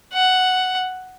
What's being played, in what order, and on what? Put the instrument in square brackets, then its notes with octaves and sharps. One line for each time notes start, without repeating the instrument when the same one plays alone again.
[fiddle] F#5